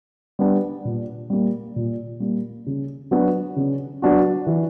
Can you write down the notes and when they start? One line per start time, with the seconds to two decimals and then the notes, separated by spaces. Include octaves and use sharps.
0.39 G3 B3 D4
0.85 A#2
1.30 G3 A#3
1.76 A#2
2.20 G3 A#3
2.67 C#3
3.11 F#3 B3 D4 F#4
3.56 C#3
4.02 F#3 B3 D4 F#4
4.47 E3